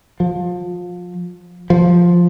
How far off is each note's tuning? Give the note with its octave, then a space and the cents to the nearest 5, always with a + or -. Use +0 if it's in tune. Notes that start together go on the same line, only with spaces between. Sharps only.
F3 +25
F3 +5